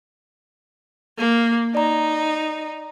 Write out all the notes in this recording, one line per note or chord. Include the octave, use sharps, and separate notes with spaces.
A#3
D#4 D5 A#5